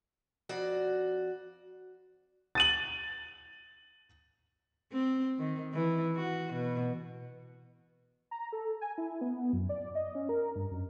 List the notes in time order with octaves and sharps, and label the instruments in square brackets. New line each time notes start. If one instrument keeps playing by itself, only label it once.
[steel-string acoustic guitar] F2 F#4 D5
[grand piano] A6 D#7 F#7
[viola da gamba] C4
D#3
E3
F#4
B2
[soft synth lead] A#5
A4
G#5
E4
B3
F#2
D5
D#5
C#4
A#4
G2
F#2